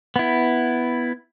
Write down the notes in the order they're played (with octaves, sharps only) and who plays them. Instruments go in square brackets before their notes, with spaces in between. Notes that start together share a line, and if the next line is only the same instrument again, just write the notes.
[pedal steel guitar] B3 E4